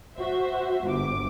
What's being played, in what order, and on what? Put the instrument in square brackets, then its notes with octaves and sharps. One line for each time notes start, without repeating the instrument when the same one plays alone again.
[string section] F#4 C5 E5
G1 D6